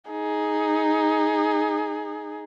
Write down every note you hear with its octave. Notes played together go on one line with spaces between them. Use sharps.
D#4 G#4